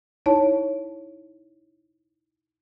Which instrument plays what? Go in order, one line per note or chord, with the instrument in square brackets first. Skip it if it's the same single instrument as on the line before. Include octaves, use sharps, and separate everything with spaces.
[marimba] D#4 E4 C#5 A5